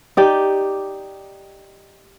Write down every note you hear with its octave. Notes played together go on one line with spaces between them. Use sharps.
D#4 G4 D5